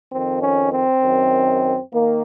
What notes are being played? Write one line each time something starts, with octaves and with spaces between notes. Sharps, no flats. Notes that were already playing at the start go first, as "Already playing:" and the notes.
F2 D#3 C4
C#4
C4
F#2 D#3
D#3 A#3